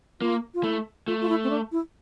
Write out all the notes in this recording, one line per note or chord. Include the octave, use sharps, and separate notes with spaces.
A#3 F4
F4
A3 E4
A3 F4
F4
E4
C4
D4
E4